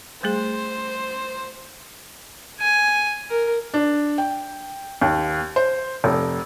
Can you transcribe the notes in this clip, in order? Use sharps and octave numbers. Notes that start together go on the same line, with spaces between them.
G3 A3 G#4 C5
G#5
A#4
D4
G5
D#2
C5
F1